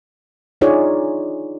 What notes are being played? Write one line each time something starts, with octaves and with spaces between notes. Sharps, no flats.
D4 D#4 F4 G#4 C#5 D5